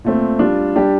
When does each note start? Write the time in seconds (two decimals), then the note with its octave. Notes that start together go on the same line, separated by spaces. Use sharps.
0.04 A#2 A3 C4
0.39 G3 D4 F4
0.76 G3 D4 G4